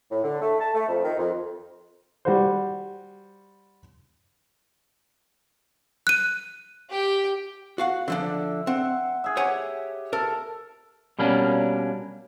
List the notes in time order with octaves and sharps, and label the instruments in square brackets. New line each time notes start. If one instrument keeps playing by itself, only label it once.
[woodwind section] A2
D3
A3
A5
A3
F2
D#3
F2
[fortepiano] G3 F#4 C5
[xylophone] F#6 D#7
[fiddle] G4 G5
[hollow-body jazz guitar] F#4 F5 F#5
[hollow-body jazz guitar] D3 F3 D4 [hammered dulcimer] E5
[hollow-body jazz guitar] C4 [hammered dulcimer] F#5
[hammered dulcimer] G#4 E5
[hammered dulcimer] G4 [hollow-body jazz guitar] C#5 F#5 G#5
[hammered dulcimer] A4 [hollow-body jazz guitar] A#4
[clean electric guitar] B2 G3 A#3 C#4 D4